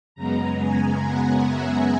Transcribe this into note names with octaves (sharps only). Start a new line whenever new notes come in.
F#2 C#3 G#3 B3 A#5
G#5
F#5
E5